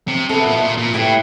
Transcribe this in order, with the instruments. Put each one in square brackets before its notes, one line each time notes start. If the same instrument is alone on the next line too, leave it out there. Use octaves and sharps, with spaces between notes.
[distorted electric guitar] C3
[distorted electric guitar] C3 [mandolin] B3 E4 A4
[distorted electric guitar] A#2
B2
A#2
A#2
[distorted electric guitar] A2 [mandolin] E4 G4 B4